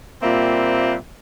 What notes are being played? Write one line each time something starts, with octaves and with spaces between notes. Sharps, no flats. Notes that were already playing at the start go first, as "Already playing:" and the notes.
A#2 G3 A#3 C4 E5